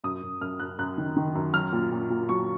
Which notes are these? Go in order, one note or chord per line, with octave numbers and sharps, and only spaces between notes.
F#2 D#6
F#2
F#2 F6
F#2 F#6
F#2 F#6
D#3
D#3
F#2
F#3 F6
A#2
A#2
A#2
F#3 C#6